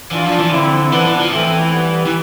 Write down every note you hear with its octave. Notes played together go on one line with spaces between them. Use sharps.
E3 D4 F4
F3
E3
D3 C4 E4
E3 B3 D4
E3
F3
E3 A3 C4
G3 B3
E3